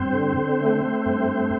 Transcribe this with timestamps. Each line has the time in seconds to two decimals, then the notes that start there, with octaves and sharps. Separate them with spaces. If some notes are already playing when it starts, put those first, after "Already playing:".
Already playing: G2 C4 C5
0.13 D3
0.36 D3
0.60 A3
0.83 A3
1.06 G2
1.30 A3